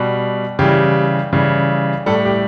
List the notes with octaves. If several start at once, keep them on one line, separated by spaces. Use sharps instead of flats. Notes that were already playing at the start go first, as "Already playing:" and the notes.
Already playing: B2 G3
C#3 E3 G3 G4
C#3 E3 G3
A2 G3 A4
G4